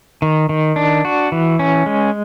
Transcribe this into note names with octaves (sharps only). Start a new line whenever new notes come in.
D#3
D#3
D4
F#4
E3
C#4
G#3